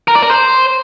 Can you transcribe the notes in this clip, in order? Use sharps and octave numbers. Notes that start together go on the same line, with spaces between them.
A#4
D5
A#4
C5